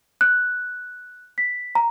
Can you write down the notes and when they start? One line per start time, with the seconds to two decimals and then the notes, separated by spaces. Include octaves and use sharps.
0.21 F#6
1.38 B6
1.75 A#5